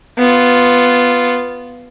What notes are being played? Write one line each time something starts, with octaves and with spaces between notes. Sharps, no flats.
B3 F4